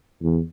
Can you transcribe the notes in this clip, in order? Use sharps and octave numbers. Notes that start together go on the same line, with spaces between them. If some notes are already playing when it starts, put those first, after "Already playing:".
E2